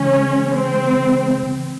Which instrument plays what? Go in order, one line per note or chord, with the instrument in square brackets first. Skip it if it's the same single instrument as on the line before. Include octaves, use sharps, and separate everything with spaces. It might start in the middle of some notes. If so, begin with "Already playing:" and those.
Already playing: [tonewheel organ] C#3 E3 G#3 [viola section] C#4
[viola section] C4